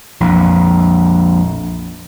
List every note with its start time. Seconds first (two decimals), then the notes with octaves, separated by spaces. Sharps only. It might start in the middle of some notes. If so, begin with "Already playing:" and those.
0.20 A#1 F2